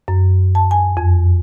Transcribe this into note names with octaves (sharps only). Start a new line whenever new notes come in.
F#2
A5
G#5
F2